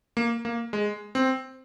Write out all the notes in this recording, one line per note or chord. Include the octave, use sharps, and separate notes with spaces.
A#3
A#3
G#3
C4